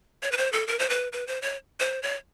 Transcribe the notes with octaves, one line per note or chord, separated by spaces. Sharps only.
C#5
B4
C5
A4
A#4
C5
B4
B4
C5
C#5
C5
C#5